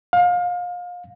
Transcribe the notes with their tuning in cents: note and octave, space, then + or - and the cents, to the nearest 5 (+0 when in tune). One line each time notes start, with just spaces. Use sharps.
F5 +30